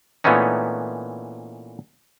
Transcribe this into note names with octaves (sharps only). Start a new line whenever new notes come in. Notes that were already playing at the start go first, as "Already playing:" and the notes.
A#2 E3 A3 B3 C#4 D#4